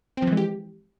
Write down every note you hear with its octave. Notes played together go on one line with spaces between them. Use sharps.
E3 F3 G#3 C4 G4